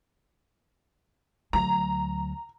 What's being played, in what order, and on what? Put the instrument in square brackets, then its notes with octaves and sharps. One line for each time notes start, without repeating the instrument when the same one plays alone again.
[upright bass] D2 F#3 [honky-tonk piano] A#5